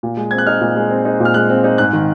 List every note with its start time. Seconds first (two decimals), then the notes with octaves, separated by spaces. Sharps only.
0.03 A#2
0.17 G#3
0.31 C4 G#6
0.38 F#6
0.46 D#4 F6
0.61 A#2
0.76 G#3
0.90 C4
1.05 D#4
1.20 A#2
1.25 F6
1.34 G#3 F#6
1.50 C4
1.64 D#4
1.78 G#2 F#6
1.93 D#3